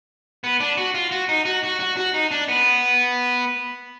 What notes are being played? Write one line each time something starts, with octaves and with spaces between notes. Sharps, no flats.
B3
D4
F#4
F4
F#4
D#4
F#4
F#4
F#4
F#4
D#4
D4
B3